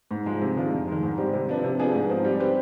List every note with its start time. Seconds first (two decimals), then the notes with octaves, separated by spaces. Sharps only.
0.11 G#2
0.26 F3 G#3
0.41 C3
0.57 D#3 G#3 D4 F4
0.72 F2
0.88 D#3 G#3
1.03 G#2
1.18 G3 C4 G4
1.33 C3
1.48 F3 B3 D4
1.64 C3
1.79 F3 B3 D4 G#4
1.95 G#2
2.09 F3 C4 D#4
2.25 G3
2.40 C4 G4 B4